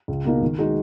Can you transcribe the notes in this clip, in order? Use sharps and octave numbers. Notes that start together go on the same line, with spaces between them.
C#2
B2 A#3 D#4
D#3
G#3 D#4 F#4